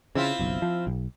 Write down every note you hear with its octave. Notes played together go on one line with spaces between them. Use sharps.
C#3 C4 E4 F4
F#1 B1
F3
B1